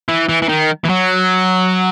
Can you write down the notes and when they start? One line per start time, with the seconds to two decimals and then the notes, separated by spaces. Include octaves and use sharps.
0.09 E3
0.29 E3
0.42 E3
0.49 D#3
0.85 E3
0.90 F#3